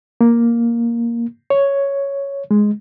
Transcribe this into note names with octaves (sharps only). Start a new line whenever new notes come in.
A#3
C#5
G#3